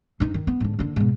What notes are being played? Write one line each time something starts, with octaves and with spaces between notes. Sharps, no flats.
G2 D#4
D#3
B3
G#2 D3
F#1 D3
G#2 B2